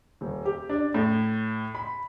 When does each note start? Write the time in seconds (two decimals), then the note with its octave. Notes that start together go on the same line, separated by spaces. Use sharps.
0.21 D#1
0.45 G4
0.69 D4
0.94 A2
1.75 B5